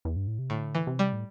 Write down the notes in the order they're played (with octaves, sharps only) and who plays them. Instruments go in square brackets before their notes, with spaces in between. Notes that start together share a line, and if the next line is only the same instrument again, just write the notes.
[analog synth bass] E2
G2
A2
C3
[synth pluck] A2 [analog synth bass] D3
[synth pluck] E3
[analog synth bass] C3
[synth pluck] G3
[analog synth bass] A2